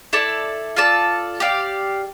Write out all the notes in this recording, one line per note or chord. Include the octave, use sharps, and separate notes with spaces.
E4 A4 D5
F4 A4 D5 A5
G4 D5 F5